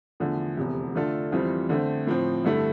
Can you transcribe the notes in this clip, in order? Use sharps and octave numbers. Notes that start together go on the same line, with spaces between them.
E2 D3 F3 A3
F1 E2 C3
D3 A3 D4 F4 A4
F2 E3 G3 C4 F4
D3 A3 C4
A2 F3 C4
G2 D3 A3 E4 A4